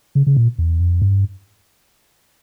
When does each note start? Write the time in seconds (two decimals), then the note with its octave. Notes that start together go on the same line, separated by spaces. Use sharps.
0.15 C#3
0.27 C#3
0.37 A#2
0.59 E2
0.80 F2
1.02 G2